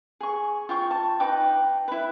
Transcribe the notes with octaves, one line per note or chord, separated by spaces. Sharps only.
G#4 C#6
F4 G5 C#6
A5
D#4 B4 G5 D6
E4 B4